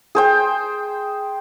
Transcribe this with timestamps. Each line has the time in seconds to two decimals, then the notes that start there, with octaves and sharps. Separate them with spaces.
0.15 G#4 C5 G5